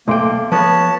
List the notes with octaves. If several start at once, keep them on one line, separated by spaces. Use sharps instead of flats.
B1 A3 A#3 G5 C6 D6
F3 B3 B4 C#5 A5